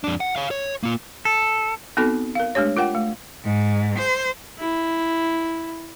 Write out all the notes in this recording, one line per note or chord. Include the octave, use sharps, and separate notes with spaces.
F2 D4
F#5
C#5 F5
C#5
A#3 F4
A4
B3 C4 D#4 F#4 A4
A#4 F5
G#3 A3 D4 G4 C#5
F4 A#4 F#5 G5
A3
G#2
C5
E4